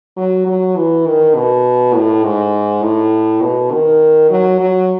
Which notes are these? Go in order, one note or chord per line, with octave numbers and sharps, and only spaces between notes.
F#3
F#3
E3
D#3
B2
A2
G#2
A2
B2
D#3
F#3
F#3